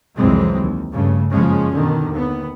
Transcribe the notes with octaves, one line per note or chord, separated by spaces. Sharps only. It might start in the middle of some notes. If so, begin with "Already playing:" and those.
C2 F2 E3 F#3 G#3 C4
D#2
G2 C#3 A3
F#1 C#3 F3 G#3 C#4
B2 D3 D#3
D#2 B3